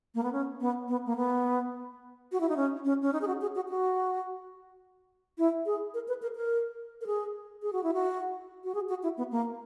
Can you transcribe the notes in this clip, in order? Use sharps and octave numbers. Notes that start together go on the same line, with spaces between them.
A#3
B3
C#4
B3
B3
A#3
B3
F#4
E4
D#4
C#4
C#4
C#4
D#4
G#4
F#4
G#4
F#4
F#4
E4
G#4
A#4
B4
A#4
A#4
A#4
G#4
G#4
F#4
E4
F#4
F#4
G#4
F#4
E4
B3
A#3